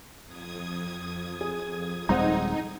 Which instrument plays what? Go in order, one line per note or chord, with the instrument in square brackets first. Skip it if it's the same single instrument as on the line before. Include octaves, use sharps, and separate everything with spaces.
[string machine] F2 D#6 G#6
[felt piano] G#4
[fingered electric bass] D#1 G3 G#3 [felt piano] C4 C5 F#5 [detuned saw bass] D#4